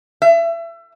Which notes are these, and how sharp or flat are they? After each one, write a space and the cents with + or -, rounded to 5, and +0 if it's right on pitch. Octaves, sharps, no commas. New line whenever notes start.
E5 +30